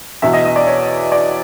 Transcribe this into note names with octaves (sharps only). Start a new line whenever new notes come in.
E2 B2 E5
D#5
D#5
D5
C#5
D5